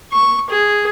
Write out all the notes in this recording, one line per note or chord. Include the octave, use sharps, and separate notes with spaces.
C#6
G#4